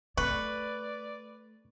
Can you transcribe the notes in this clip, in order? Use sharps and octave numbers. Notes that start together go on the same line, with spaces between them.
A3 B4 D5 C#6